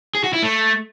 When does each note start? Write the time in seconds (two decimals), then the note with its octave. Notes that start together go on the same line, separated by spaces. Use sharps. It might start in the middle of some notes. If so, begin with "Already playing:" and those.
0.15 G#4
0.24 F#4
0.33 E4
0.42 A3